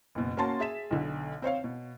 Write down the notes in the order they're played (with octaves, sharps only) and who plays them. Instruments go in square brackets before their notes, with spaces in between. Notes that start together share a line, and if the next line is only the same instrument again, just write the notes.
[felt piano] F#1 B2
A#3 C#4 F#4 A5 C6 A6
G#4 E5 B6 E7
B1 B2 D3
C4 C5 C#5 F5
B2